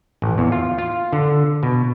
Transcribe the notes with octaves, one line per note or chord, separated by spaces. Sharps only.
A1
E2
F4
F4
D3
B2